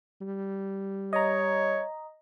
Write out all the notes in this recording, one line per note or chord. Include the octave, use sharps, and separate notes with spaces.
G3
C#5 D#5 A#5